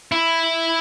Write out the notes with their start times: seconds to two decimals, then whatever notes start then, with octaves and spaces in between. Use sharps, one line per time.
0.12 E4